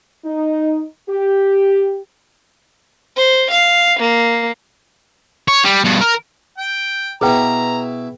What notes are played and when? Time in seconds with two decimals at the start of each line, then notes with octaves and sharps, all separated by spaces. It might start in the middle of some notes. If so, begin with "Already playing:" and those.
0.25 D#4
1.08 G4
3.16 C5
3.50 F5
3.99 A#3
5.48 C#5
5.64 G3
5.84 G2 B2
6.01 A#4
6.58 G5
7.21 B2 E4 G#4 B4 G5 A#5